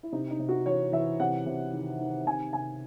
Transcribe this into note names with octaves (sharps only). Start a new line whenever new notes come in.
E4
C3 D#4
D#4
C3
F#4
E3 C#5
E3 E5
C3 F#5
C3
D#3
D#3
C3 G#5
C3 G#5